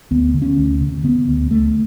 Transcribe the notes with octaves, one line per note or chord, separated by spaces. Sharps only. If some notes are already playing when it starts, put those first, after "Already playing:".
D2 B3
D3
C#4
D2
D3
D3 B3
D2
D2 A3